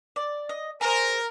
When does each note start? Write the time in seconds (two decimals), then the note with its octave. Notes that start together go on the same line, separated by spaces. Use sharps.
0.16 D5
0.49 D#5
0.81 G#4 A#4 C5